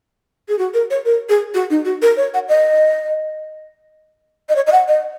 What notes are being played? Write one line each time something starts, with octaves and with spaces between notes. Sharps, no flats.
G#4
F#4
A#4
C#5
A#4
G#4
F#4
D#4
F#4
A#4
C#5
F#5
D#5
D#5
C#5
D#5
F#5
D#5